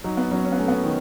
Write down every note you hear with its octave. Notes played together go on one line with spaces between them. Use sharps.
F#3 D#4
B3
F#3 C#4
C#4
B3
A3 C#4
B3
D#3